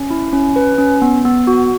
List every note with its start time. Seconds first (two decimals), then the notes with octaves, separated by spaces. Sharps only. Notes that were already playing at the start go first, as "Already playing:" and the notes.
Already playing: C#4
0.10 E4
0.33 C#4
0.56 B4
0.78 C#4
1.02 B3
1.25 B3
1.47 F#4